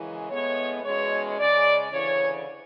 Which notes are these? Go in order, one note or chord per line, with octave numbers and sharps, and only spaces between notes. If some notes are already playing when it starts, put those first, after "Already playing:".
Already playing: F#2 C#3 E3 G#3
A2 G#3 B3 C#5
E2 B2 G#3 C#4 C#5
C#3 G#3 C#4 D5
D2 C#3 E3 C#5